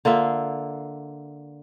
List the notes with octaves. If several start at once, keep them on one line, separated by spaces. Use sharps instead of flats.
D3 A#3 F4 E5